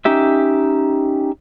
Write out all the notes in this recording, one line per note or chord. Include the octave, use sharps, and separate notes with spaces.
C#4 D#4 G4 E5